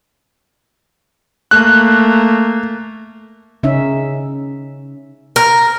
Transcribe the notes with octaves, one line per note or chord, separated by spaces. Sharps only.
A3 A#3 F#6
C#3 C#4 D#4 E5
A#4